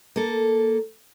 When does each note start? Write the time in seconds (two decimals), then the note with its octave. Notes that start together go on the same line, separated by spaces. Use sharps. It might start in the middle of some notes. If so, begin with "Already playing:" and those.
0.16 A#3 A4